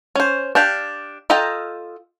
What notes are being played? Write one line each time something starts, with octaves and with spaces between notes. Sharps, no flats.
C#4 C5
D4 G4 F5
F4 A4 D#5 G5 A#5